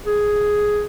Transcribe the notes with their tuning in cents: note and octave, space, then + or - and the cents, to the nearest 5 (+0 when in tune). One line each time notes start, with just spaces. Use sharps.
G#4 +5